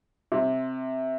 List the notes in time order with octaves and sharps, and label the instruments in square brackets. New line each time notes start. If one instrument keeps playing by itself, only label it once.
[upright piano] C3